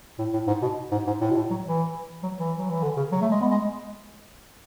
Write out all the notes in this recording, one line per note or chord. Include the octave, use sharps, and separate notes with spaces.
A2
A2
G#2
B2
G#2
G#2
A2
B2
A2
F#3
E3
F#3
E3
F#3
E3
D3
C#3
F#3
A3
G#3
B3
G#3